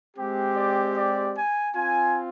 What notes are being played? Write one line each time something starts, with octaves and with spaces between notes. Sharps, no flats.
G#3 C4 G4
D5
D5
G#5
C4 F4 G#5